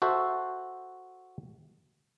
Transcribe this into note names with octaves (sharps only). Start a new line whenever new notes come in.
F#4 A4 C5 E5